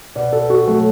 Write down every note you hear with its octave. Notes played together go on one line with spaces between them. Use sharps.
B2 D5
A4
F#4
F#3 A3